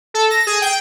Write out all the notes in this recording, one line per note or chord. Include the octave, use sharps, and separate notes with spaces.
A4
A#6
G#4
G5